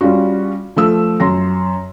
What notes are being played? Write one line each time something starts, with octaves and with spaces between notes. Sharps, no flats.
G3 C#4 F4 F#4
F3 A3 E6
F#2 C6 A#6